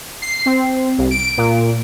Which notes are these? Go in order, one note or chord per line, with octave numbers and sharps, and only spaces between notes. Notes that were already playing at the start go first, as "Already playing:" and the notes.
C7
C4
C2
D7
A#2